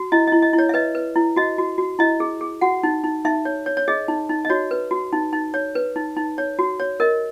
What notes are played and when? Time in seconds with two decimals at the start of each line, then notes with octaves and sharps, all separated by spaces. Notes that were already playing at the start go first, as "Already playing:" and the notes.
Already playing: F#4
0.12 E4 D#5
0.27 E4 D#5
0.42 D#5
0.53 E4
0.58 C#5
0.69 E5
0.74 B4 D#5
0.95 B4
1.16 E4
1.36 F#4 D#5
1.58 F#4
1.78 F#4
1.99 E4 D#5
2.20 G#4
2.41 G#4
2.61 F#4 F#5
2.83 D#4
3.04 D#4
3.25 D#4 E5
3.45 C#5
3.66 C#5
3.77 C#5
3.88 G#4 D#5
4.08 D#4
4.29 D#4
4.45 D#5
4.50 F#4 C#5
4.71 B4
4.91 F#4
5.13 D#4
5.33 D#4
5.54 C#5
5.75 B4
5.96 D#4
6.17 D#4
6.38 C#5
6.59 F#4
6.80 C#5
7.00 A#4 D#5